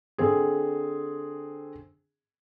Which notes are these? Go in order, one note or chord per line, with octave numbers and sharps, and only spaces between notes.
D3 C4 G#4